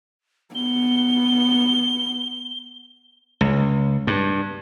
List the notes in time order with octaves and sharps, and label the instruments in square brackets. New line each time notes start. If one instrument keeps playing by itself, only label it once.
[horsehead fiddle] B3 [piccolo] G7
[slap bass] C#2
G2